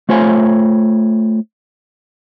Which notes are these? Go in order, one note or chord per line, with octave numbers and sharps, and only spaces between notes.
A3 F4 C5 C#5 G#5